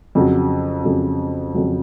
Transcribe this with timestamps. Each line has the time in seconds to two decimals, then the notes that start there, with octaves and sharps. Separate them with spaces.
0.15 F2 C#3 F#3
0.84 F2 C#3 F#3
1.54 F2 C#3 F#3